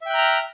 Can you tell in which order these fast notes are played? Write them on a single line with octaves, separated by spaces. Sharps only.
E5 G5 F#6 A#5 F6